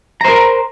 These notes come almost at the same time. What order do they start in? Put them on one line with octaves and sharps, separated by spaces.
A#5 C5 A#4